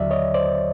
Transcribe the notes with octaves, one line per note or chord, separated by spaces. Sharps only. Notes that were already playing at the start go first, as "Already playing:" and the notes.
Already playing: D#2 D3 F#3 D5 E5
C#5 D#5
C5 D5